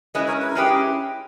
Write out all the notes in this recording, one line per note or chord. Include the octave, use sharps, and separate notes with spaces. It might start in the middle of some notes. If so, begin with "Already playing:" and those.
G#3 C#4 E4 B4 D#5
A#4 C#5
B4
A#4
G#3 C#4 E4 G4 G#4 B4